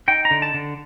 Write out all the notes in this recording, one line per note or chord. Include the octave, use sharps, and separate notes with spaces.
D#4 G5
A#5
D3
A5
D3